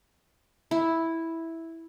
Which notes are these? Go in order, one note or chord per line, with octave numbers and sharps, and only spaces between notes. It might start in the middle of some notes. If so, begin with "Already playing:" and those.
E4